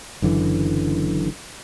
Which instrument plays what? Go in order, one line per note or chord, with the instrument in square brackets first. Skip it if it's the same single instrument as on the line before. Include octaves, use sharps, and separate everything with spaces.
[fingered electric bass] F#1 F#2 D3 E3